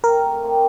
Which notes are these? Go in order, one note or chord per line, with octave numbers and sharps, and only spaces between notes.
F3 A3 C4 G4 A#4
F3 A3 C4 G4